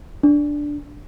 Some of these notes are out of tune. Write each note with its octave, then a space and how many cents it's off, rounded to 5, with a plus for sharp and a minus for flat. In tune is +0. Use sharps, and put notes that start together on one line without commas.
D4 +0